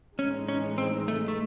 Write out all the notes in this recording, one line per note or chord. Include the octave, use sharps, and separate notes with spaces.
A2 E3 G#3 C#4 D#4
C#4
C4
A3
A3